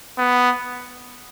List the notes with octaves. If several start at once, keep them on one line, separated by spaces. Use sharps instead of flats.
B3